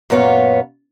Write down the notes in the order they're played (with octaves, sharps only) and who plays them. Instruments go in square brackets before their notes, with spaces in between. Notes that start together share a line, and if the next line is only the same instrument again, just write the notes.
[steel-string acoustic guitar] F#2 A#2 B3 C#5 F5